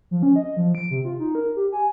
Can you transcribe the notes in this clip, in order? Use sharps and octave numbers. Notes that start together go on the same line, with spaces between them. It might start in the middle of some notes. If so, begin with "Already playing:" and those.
F3
C#4
D#5
F3
D7
C3
F4
D#4
A#4
G4
G#5